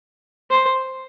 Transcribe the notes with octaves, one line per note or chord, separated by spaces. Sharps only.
C5